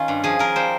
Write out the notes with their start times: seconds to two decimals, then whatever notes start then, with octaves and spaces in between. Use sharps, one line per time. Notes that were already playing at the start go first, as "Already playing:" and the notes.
Already playing: D#3 C#4 F4
0.08 G2
0.24 F3 G#4
0.39 F3 A#4
0.56 G3 C5